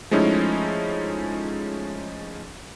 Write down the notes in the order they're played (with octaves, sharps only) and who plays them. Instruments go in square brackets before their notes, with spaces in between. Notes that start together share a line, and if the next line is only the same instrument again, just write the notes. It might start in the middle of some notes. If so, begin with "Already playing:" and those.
[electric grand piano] F3 G#3 A3 C#4 D#4 E4